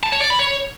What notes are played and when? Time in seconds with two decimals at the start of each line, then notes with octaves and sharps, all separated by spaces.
0.03 A5
0.12 C#5
0.21 D5
0.30 B5
0.39 C#5